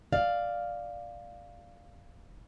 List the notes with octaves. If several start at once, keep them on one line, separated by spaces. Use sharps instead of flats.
D5 F5